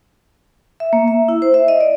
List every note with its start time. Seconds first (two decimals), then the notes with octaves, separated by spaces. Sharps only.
0.80 E5
0.93 A#3
1.08 E5
1.28 E4
1.42 C5
1.54 E5
1.68 D#5
1.81 D5